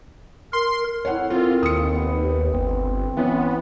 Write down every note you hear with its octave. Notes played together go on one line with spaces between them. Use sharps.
A#4 C6
C4 E4 A4 C#5 F#5
A#3 C4 F4 C5
D#2 D#6 C#7
B3
G1 C4
E3 B3 C#4 C6